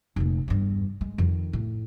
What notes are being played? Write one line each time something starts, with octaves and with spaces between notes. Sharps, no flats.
F1 A#2
E2 G2
G#3
F2 D#3
A2